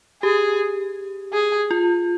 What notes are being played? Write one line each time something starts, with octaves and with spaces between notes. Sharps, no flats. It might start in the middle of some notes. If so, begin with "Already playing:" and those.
G4 G#4
G#4
F4